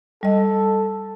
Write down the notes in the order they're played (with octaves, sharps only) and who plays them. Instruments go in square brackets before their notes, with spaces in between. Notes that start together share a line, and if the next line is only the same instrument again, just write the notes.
[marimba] G3 D#5 [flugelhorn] A4